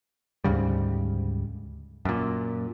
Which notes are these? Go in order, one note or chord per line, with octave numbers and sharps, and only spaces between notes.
D2 G#2 C#3 G3
F#2 A#2